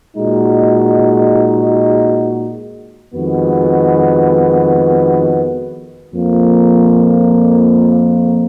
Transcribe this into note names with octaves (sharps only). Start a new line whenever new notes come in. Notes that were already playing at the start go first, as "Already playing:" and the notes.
A#2 G#3 D#4 F#4
F2 D#3 G#3 B3 F#4
F2 F3 A#3